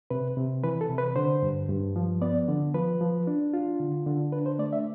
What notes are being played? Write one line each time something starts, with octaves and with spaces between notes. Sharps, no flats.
C3 B4
C3
E3 B4
A4
C3
B4
D3 C5
G2
G2
F3
B3 D5
D3
F3 B4
F3
D4
F4
D3
D3
D4 B4
C5
A3 D5
E5